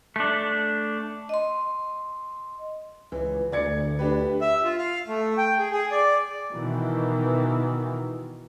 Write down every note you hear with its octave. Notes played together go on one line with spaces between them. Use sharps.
A3 D4
D#5 C6
C#2 E3
D2 D5 G#6 C#7
D4 G4 B4
E5
F4
F5
A3
G5
G#4
G#4
D5
B2 D#3 E3